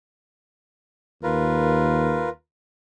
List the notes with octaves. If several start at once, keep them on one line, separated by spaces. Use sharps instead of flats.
D#2 F4 A#4 B4